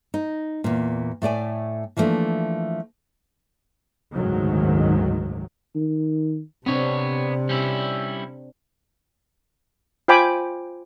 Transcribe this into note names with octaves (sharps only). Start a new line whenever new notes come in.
D#4
E2 A#2
A2 A3 D5 G#5
E3 F3 G3 A3 A#3 D4
F#1 D2 G#2 D#3 F#3
D#3
C3 B3 C4 D4 C#5
G3 C#4 E4
F4 C5 G5 G#5 B5 D6